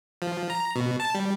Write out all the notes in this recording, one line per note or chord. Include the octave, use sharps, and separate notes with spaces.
F3
A#5
B2
A5
G3